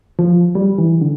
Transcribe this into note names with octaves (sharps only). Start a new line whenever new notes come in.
F3
G3
E3
D3